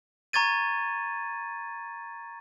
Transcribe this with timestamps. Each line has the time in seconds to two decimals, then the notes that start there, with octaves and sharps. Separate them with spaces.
0.33 A#5 C#6 G#6 A6 D#7